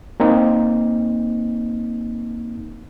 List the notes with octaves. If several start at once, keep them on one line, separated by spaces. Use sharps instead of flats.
A#3 C4 D#4